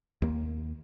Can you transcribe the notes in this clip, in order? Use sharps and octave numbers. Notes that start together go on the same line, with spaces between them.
D#2 A#3